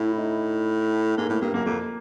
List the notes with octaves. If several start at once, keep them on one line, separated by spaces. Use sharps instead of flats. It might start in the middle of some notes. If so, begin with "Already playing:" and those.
Already playing: A2 E4
E4
D#4
G#2 A#3
A2 A#3
G2 A#3
F#2 A#3
F2 A#3